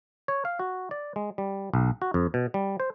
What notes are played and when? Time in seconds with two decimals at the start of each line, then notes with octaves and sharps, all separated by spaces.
0.28 C#5
0.45 F5
0.59 F#4
0.91 D5
1.16 G#3
1.38 G3
1.74 B1
2.02 F#4
2.14 F2
2.34 B2
2.54 G3
2.80 C5